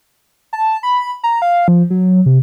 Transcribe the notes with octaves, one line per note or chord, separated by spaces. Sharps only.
A5
B5
A#5
F5
F3
F#3
C3